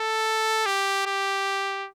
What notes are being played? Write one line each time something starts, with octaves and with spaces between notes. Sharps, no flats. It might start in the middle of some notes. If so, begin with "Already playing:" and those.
Already playing: A4
G4
G4